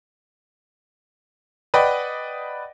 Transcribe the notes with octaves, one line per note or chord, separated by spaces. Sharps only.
B4 D5 D#5 F#5 G5